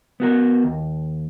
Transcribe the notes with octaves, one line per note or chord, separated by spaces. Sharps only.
B3 F#4 A#4
D#2